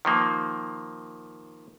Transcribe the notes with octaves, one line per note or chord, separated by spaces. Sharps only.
D#3 F3 A#3